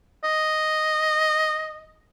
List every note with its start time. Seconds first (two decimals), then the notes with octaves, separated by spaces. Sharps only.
0.24 D#5